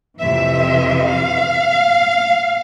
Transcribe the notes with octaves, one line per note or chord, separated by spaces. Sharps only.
F2 C3 E3 E5
F5